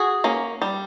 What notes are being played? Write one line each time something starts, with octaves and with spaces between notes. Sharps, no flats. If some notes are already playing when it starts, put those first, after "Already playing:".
Already playing: F#4 G#4
A#3 C#4
G3